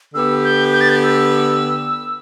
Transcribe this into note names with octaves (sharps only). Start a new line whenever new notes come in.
D3 B3 G4 E6
G6
G6
A6
G6
E6